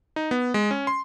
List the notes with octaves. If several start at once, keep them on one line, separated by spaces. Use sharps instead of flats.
D#4
B3
G#3
C#4
C6